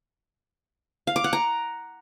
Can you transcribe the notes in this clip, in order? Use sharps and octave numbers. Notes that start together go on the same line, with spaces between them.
F5
D6
F#5
A#5